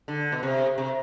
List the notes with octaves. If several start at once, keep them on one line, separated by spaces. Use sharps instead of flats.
D3
B2
C3
C3